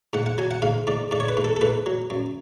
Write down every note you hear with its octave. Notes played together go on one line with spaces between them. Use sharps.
G#2 F#5
F#5
F#3 G#5
F#5
G#2 F5
G#2 D5
G#2 D5
C#5
B4
G#2
A4
A4
G#2 B4
F#3
F#2